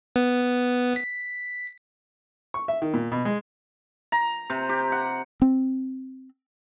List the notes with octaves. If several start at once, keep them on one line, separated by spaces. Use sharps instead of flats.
B3
B6
C#6
E5
D#3
A#2
B2
G#3
A#5
C3
G4
F#5
C4